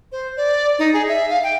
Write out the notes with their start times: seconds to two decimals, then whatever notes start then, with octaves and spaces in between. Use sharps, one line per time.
0.12 C5
0.37 D5
0.79 D#4
0.94 G#4
1.08 E5
1.30 F5
1.43 G5